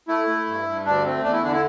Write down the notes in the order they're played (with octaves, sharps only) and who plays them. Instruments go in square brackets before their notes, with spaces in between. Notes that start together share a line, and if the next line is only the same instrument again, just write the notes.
[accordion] A3 E4
A3
G2
G2
D2 D4
A3 C4
E2 D4
E4
D3 D4
E4